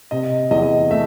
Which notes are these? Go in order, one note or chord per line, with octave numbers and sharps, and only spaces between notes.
C3 D#5
E2 D#5
A3 E5